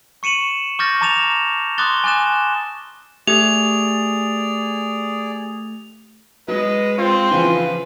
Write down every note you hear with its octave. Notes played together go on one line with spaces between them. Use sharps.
C#6 C#7 D#7 E7 F#7
C#6 D6 F6 G6 A6 A#6
A5 A#5 D6 A6 E7 F7
C6 D6 D#6 F#6 A6 G7
G#5 D6 F#6 A6 E7
A3 G4 G#4 D5 F7
F#3 G#3 B4 D#5
C4 F4
C#3 E3 F3 F4 B4